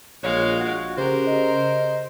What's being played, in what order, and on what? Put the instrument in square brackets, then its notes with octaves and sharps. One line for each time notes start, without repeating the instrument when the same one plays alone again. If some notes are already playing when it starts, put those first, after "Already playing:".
[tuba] A#1 [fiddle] G#3 F5 [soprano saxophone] C#5 [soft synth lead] F#6
[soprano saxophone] F#4
[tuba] C#3 [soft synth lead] G4 [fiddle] A#4 [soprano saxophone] C5
[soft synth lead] D#5